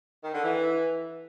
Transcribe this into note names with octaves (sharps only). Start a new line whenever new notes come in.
D#3
D3
E3